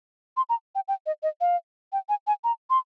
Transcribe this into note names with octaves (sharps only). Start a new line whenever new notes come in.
C6
A#5
G5
G5
D#5
D#5
F5
G5
G#5
G#5
A#5
C6